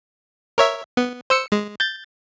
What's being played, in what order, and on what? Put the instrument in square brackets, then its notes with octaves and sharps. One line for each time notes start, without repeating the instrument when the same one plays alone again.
[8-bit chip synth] A#4 C#5 E5
B3
C5 E6 C#7
G#3
G6 A6